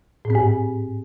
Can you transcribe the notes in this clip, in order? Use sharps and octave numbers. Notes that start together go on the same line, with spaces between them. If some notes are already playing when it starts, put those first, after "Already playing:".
A2
C4
G#2